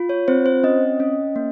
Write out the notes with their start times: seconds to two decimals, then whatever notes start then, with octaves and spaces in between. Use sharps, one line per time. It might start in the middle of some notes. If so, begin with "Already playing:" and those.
Already playing: F4
0.09 C#5
0.28 C4 C5
0.46 C5
0.64 C#4 D#5
1.00 C#4
1.36 A#3